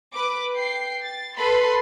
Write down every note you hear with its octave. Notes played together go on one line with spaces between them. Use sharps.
B4 D6
G5 C7
A6
A4 B4 B5 C6